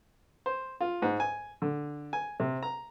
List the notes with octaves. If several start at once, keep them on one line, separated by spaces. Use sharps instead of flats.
C5
F4
G#2
G#5
D3
G#5
C3
A#5